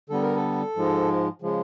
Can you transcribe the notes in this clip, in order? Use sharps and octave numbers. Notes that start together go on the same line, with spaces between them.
D3 G3 B3 A4
A#4
A4
G#2 F3 G#3
C#3 F3 G#3